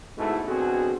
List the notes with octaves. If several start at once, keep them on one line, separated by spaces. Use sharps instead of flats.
G#2 B2 G#3 A3 E4
B2 D3 C4 F#4 G#4